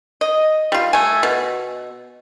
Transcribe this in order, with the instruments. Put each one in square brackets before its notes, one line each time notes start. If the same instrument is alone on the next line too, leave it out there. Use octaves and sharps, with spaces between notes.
[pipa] D#5
G3 F4
A3 G#5
B2